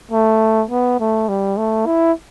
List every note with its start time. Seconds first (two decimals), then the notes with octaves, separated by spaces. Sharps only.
0.11 A3
0.70 B3
1.00 A3
1.28 G3
1.57 A3
1.86 E4